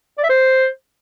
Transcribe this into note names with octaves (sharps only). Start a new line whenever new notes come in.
D5
E5
C5